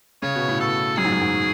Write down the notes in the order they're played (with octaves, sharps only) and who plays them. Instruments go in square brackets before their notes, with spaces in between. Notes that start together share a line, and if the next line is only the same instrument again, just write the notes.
[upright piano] C#3 [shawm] C#5
[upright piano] B2
A2
[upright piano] B2 [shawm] A4
[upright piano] F#2 [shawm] G#4
[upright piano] G#2
F#2
G#2